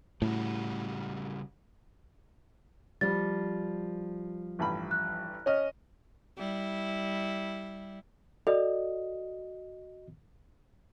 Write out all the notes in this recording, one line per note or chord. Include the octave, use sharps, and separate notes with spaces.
A2 C#3 G3 F#4
F3 G3 A6
A1 G2 B5
F#6
C#4 C#5 D#5 F6
G3 E4
F#4 A4 D5 D#5